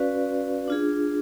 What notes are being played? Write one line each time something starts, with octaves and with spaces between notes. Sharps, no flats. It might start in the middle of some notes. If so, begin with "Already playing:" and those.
Already playing: C#4 F#4 B4 D5 F5
D4 F4 G#4